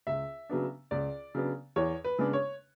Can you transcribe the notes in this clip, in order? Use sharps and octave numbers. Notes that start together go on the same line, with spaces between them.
C#2 E5
C#3 F#3 B3 D4
C#2 D5
C#3 F#3 B3 D4
E2 C#5
B4
C#3 G#3 B3 D4
C#5